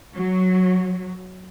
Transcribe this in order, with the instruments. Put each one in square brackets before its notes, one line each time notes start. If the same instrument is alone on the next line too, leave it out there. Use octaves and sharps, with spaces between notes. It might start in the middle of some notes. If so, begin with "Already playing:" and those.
[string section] F#3